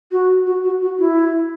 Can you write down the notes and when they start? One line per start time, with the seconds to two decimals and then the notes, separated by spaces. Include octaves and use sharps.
0.11 F#4
0.46 F#4
0.63 F#4
0.81 F#4
0.98 E4